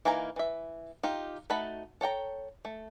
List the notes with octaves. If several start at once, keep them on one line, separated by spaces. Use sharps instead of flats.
E3 A#3 D#4 G#5 A#5
E3 E5
D#4 F4 G4
A3 D#4 F#4 A5 B5
A4 C#5 G5 A#5
A3